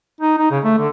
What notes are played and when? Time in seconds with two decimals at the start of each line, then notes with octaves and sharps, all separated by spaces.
0.21 D#4
0.38 D#4
0.51 C#3
0.64 A3
0.78 D3